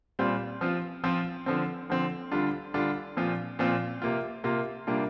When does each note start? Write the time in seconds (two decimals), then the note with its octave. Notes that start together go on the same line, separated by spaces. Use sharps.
0.19 A#2 G3 C4 F4
0.61 F3 C4 F4
1.04 F3 C4 F4
1.46 D3 F3 C4
1.90 D3 F3 C4
2.32 D3 G3 D4 F4
2.74 D3 G3 D4 F4
3.17 A#2 F3 C4 F4
3.59 A#2 F3 C4 F4
4.02 C3 A#3 F4
4.44 C3 A#3 F4
4.87 C3 G3 A#3 D4 F4